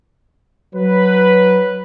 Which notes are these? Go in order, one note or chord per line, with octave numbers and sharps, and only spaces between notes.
F#3 B4